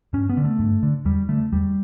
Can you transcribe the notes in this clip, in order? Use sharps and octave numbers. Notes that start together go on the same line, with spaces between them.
G2 C#4
B3
D3
A3
G2
D3
E2 G3
D3 A3
E2 G3